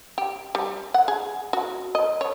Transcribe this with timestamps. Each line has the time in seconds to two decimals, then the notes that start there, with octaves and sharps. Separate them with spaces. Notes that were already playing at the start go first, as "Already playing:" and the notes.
0.18 G4
0.55 G3
0.94 F#5
1.08 G#4
1.53 F#4
1.95 D#5
2.21 C#5